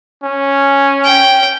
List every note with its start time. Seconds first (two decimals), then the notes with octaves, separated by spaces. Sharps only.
0.24 C#4
1.05 G5